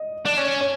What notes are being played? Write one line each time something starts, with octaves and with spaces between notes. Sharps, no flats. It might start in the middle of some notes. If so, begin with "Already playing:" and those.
Already playing: D#5
D4
C#4
C#5